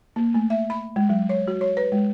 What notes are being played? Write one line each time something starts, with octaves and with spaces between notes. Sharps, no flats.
A#3
A3
E5
B5
G#3
F#3
C#5
F#4
C#5
B4
G#3